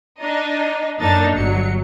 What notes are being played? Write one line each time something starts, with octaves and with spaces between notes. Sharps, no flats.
D4 D#4 D#5
F#2 A#3 D4 D#4 A4 A6
G1 F#3 C#7